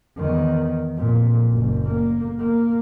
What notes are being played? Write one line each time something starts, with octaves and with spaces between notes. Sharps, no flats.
E2 D#3
F2 A#2
F#1
A#3
A#3